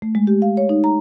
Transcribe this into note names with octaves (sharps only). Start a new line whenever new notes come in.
A3
G#3
G4
F5
C#5
D#4
A#5